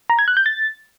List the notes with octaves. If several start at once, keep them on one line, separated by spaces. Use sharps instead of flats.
A#5
G#6
F#6
G6
A6